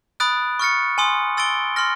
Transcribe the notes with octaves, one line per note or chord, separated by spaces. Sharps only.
B5 D#6 F#6 A6 D7
C#6 F6 A6 C#7
G#5 C6 D#6
C6 E6 A6 D7 G7
C6 F6 A#6